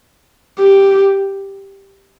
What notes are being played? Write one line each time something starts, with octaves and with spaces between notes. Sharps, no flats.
G4